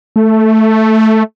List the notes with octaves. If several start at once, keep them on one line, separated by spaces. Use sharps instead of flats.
A3